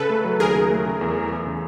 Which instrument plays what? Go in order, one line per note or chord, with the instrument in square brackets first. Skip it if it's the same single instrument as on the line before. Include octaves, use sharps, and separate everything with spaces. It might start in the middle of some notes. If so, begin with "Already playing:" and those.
Already playing: [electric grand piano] C#3 [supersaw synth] A4 B4
[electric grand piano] A3
F#3
[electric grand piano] D#2 [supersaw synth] G#4 A#4
[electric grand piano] C#3
A3
C#3
E2
E3
E2
C#3